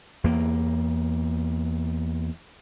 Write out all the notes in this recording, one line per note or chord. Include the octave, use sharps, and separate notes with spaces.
E2 A#3